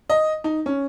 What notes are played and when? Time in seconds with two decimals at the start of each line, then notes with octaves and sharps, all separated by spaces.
0.10 D#5
0.44 D#4
0.66 C#4